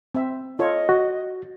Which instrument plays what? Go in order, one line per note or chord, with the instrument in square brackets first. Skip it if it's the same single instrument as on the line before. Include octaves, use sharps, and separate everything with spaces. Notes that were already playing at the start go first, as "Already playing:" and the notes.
[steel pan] C4 E5
[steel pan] F4 A4 C#5 [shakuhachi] D#5
[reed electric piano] F#4